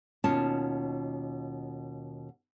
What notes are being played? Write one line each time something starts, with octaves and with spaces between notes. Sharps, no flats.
D#2 B2 C#4 F4 A5